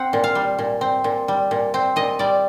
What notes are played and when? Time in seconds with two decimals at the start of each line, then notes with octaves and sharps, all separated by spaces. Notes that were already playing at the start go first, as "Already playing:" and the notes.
Already playing: C4 F#5
0.13 A#2
0.24 F5
0.35 G3
0.59 A#2
0.81 C4
1.04 A#2
1.28 G3
1.51 A#2
1.74 C4
1.96 A#2 D#5
2.19 G3 D5